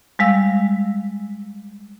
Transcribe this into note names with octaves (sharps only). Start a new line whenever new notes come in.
G3 G#3 F5 E6